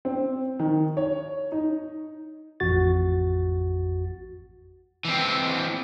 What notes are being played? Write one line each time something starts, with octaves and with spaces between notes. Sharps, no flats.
C4
D#3
C#5
D#4
A1 F2 F#4 A6
E3 C4